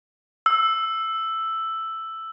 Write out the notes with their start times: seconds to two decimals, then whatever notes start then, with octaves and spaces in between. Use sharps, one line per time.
0.46 E6